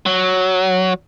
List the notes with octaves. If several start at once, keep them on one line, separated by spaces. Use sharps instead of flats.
F#3